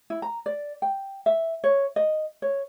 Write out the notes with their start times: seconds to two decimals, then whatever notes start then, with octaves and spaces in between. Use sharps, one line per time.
0.10 E4
0.22 A#5
0.46 D5
0.82 G5
1.26 E5
1.64 C#5
1.96 D#5
2.42 C#5